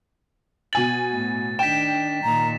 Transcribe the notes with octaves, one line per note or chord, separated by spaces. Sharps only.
B2 G#5 A6 F#7
A2
D#3 D4 G5 B6 E7
A#2 D#3 A#5